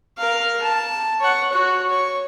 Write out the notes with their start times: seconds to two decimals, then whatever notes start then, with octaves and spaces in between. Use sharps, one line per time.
0.18 A#4 F5
0.62 A5
1.20 C#5 F#5
1.52 F#4 C#5
1.90 C#5